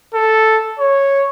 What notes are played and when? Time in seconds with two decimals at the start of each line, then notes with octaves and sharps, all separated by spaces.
0.14 A4
0.79 C#5